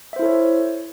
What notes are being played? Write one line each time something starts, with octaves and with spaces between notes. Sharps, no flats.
E4 A4 C5 C#5 E5